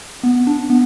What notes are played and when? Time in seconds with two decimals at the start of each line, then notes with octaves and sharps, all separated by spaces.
0.23 B3
0.47 D4
0.70 B3